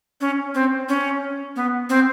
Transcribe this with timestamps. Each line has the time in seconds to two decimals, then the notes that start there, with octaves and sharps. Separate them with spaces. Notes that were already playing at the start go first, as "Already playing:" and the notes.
0.21 C#4
0.54 C4
0.89 C#4
1.56 B3
1.90 C4